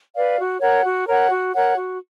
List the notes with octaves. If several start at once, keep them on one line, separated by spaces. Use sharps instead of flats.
B4 D5 F5
F#4
A#4 C#5 F#5
F#4
A#4 C#5 F#5
F#4
A#4 C#5 F#5
F#4